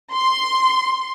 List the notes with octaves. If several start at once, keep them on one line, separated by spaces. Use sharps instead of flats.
C6